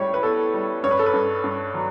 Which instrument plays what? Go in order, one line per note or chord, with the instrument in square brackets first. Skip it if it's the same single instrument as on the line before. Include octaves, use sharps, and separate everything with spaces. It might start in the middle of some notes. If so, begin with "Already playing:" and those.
Already playing: [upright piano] A2 G3 C#5
B4
B3 A4
G3
G2 C#5
B4
A4
B4
G2
G2
F#3